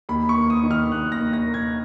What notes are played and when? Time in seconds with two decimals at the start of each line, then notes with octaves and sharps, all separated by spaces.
0.09 D#2 B5
0.29 C#6
0.37 A#3
0.50 D#6
0.63 D#3
0.71 F6
0.92 D#2 F#6
1.12 A#6
1.19 D#2
1.33 A#6
1.47 A#3
1.54 G#6